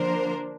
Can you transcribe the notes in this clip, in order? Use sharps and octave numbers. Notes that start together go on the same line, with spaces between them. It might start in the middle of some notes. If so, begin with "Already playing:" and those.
Already playing: D3 F3 A#3 D4 A#4 C5